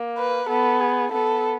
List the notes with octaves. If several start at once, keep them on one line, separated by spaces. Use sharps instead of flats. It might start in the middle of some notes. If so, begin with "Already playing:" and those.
Already playing: A#3
B4
B3 A4
G#4
B3 A4